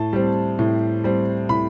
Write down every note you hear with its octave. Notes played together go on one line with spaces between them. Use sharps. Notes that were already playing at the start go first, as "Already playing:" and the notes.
Already playing: A2 A5
G3 C4
A2
G3 C4
A2 B5